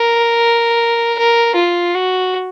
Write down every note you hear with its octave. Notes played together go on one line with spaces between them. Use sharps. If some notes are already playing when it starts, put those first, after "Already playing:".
Already playing: A#4
A#4
F4
F#4